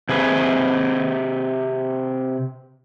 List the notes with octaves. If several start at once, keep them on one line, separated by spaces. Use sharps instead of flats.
C3 G#4 B4